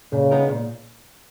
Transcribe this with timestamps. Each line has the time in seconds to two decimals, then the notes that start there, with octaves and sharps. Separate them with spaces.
0.13 A#2 C#3
0.31 G#3 B3 D#4 A#4
0.49 A#2